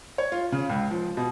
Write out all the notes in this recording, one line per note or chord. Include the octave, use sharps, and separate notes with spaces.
C#5
F4
C#3
C#2
F3
B2